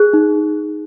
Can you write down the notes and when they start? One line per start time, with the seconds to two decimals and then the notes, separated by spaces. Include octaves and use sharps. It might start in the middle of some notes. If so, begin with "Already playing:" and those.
Already playing: G#4 F#6
0.13 D#4